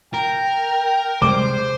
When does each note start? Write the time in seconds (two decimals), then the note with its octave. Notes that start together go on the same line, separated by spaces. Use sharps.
0.14 A#4 G5
1.22 C3 G3 G#3 C5 D6